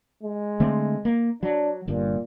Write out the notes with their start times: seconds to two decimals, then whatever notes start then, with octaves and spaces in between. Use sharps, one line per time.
0.23 G#3
0.60 D3 A3 C4
1.05 A#3
1.43 F#3 D4
1.88 G1 G2 A#2